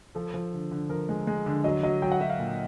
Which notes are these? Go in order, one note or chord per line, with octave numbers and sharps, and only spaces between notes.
F3 A4
F3
D3
D3
F3 A#4
G#3
G#3
D3
F#3 D#5
F#3 D#5
F#3 G5
F#5
F#3 E5
F5
A#2